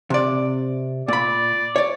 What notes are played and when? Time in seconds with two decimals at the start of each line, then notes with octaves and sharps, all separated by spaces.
0.10 C3 D5
1.08 A#2 D5 B5
1.76 C#5 D5